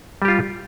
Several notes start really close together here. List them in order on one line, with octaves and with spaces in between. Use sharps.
G3 G4 F4